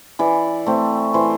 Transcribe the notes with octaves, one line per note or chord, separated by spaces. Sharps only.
E3 D5
A3 C4
E3 C5